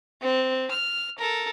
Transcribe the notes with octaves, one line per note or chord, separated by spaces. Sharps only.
C4
F6
A4 A#4